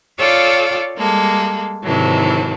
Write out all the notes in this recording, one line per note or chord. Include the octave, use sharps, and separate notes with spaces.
F4 A4 C#5 D5 F5 G5
G3 G#3 A#3 A4
G#2 C3 D#3 E3 F#3 A3